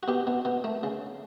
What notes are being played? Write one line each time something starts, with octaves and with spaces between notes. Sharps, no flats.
F#4
B2 G4
B2
B2
A3
C#3